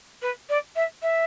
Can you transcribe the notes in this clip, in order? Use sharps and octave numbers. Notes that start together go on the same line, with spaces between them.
B4
D5
E5
E5